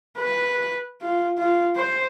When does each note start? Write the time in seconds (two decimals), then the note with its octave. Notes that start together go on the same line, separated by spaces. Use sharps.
0.18 B4
1.02 F4
1.38 F4
1.76 C5